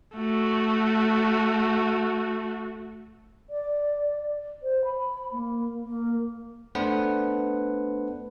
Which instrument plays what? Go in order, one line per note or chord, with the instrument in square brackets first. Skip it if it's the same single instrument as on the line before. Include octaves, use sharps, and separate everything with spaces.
[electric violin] A3 F#4
[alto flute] D5
C5
B5
A#3
A#3
[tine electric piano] A3 B3 D4 B4 C5 F#5